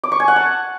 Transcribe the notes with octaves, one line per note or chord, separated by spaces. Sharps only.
D6
C#6
G#5
F#5
A5